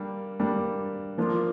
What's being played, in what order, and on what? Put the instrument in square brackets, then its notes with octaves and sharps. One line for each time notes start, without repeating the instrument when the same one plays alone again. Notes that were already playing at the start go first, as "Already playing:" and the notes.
Already playing: [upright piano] G3 A#3 D4
G3 A#3 D4
F3 A#3 D4 F4